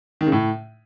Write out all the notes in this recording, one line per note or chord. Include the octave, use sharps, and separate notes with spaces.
D#3
C#3
A2